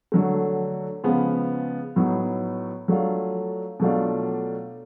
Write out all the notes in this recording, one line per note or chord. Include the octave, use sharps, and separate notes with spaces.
D3 F#3 A3
C#3 F3 G#3 B3
A2 F#3 B3 D#4
F#3 A3 D4 F4
B2 F#3 A3 D4 F4